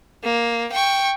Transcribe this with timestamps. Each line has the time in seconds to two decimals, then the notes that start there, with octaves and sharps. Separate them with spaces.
0.24 A#3
0.72 G5 C#6